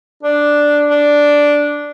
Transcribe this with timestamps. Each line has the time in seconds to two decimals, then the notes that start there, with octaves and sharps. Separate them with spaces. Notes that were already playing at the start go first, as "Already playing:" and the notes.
0.23 D4
0.90 D4